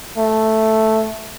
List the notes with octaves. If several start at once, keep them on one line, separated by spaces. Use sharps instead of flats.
A3